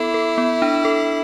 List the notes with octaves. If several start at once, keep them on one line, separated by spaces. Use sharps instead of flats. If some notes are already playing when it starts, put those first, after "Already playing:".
Already playing: B3 E4 A4
A4
B3
D4
A4